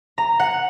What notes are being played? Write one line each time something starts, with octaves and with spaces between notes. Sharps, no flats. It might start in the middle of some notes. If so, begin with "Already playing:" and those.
A#5
F#5